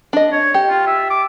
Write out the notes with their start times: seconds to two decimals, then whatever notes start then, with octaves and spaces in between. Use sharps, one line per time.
0.13 D4 D#5
0.32 C#5
0.54 G4
0.70 F4
0.87 E5
1.10 D6